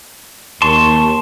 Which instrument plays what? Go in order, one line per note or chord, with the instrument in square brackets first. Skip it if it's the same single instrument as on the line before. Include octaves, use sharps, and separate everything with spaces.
[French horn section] D#2 [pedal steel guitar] A5 C6 C#6